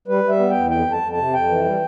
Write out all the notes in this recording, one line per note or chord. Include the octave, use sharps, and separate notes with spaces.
G3 B4
G3
E5
B3
G5
E2
F2 G5
F2
A5
F2
A5
C3
F2 G5
E3
G3